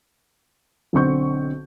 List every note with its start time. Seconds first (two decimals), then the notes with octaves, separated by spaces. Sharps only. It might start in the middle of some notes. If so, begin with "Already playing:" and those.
0.93 B1 D3 C4 C#6 G6